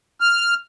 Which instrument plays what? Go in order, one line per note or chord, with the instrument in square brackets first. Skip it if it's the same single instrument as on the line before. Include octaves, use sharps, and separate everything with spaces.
[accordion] F6